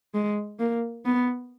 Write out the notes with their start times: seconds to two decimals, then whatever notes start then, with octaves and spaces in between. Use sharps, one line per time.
0.14 G#3
0.59 A#3
1.06 B3